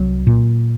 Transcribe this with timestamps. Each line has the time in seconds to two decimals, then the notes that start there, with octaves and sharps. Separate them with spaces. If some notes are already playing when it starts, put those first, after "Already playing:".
Already playing: C2 F#3
0.27 A#2